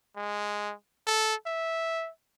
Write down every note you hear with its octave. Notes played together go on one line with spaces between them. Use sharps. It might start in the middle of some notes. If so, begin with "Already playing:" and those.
G#3
A4
E5